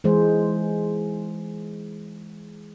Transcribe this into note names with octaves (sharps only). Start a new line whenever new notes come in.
E3 G#3 G#4 C5